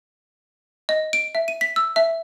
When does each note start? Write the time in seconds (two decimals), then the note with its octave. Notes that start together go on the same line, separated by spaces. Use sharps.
0.89 D#5
1.13 D7
1.35 E5
1.48 D#7
1.61 B6
1.76 E6
1.96 E5